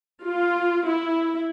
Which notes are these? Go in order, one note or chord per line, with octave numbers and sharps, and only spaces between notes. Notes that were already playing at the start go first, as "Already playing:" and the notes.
F4
E4